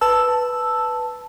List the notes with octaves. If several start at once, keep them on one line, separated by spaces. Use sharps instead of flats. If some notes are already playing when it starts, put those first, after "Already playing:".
B4 A5 E6